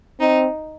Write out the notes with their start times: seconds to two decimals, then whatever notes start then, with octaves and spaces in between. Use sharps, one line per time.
0.20 C4 D#4